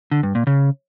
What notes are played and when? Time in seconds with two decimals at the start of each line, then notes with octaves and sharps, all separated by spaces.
0.12 D3
0.23 G2
0.35 A#2
0.47 C#3